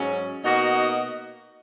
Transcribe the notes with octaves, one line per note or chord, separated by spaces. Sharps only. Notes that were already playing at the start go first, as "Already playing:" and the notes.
Already playing: G#2 F#3 C#4
B2 A#3 D#4 F#4